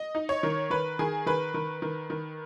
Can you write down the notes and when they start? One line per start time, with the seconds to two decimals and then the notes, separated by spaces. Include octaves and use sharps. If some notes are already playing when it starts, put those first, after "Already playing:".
Already playing: D#5
0.15 D#4
0.29 C#5
0.43 D#3
0.70 D#3 B4
0.99 D#3 G#4
1.26 D#3 B4
1.54 D#3
1.82 D#3
2.10 D#3